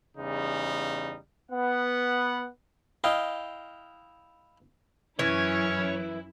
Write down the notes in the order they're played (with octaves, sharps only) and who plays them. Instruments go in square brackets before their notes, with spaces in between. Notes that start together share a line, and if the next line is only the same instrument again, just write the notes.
[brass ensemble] E2 C#3 G3 D#4
B3 F#5
[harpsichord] E4 D#5 F5 G5
[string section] F#2 E4 [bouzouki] E3 [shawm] C#4 [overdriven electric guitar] C#5